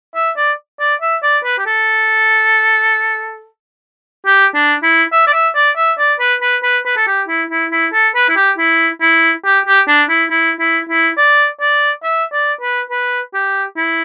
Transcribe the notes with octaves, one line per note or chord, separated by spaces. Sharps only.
E5
D5
D5
E5
D5
B4
G4
A4
G4
D4
E4
E5
D5
E5
D5
E5
D5
B4
B4
B4
B4
A4
G4
E4
E4
E4
A4
B4
E4
G4
E4
E4
G4
G4
D4
E4
E4
E4
E4
D5
D5
E5
D5
B4
B4
G4
E4